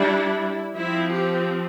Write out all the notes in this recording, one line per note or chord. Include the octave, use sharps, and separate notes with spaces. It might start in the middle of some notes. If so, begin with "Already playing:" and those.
Already playing: G3 D4 E4
F3 C4 E4
G4